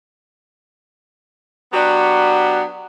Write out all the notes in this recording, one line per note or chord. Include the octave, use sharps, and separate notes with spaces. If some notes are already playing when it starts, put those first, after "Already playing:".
F#3 B3 D4 F#4 G4